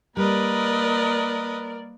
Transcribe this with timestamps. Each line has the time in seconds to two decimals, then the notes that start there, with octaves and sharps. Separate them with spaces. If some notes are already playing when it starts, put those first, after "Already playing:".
0.17 G3 A#3 A#4 B4 D5 D#5